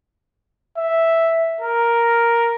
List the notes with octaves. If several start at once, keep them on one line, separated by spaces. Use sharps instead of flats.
E5
A#4